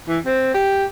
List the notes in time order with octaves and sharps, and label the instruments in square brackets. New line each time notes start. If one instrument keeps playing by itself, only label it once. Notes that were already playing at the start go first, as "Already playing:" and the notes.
[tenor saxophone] E3
C4
G4